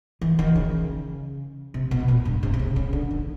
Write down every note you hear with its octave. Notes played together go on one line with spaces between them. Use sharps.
E3
D#3
C#3
C3
B2
A#2
G2
C3
C3
C#3
C#3
D3
D#3